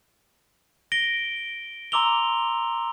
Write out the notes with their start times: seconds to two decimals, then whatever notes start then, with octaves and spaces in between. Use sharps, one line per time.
0.92 A#6 D7 G7
1.92 A#5 C6 D6 E6 F7 G7